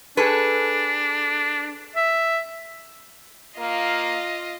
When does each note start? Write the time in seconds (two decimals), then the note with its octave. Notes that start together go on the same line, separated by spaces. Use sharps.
0.17 D4 G#4 A4 B4
1.96 E5
3.59 A#3 F4 D#5